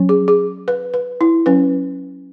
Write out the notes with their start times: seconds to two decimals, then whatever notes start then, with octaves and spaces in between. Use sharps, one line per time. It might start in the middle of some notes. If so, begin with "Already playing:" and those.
Already playing: F#3 C#4
0.09 G#4
0.28 G#4
0.68 B4
0.94 B4
1.21 E4
1.46 F#3 C#4 B4